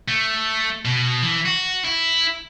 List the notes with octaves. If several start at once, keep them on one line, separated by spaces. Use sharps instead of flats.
A3
B2
E3
F#4
E4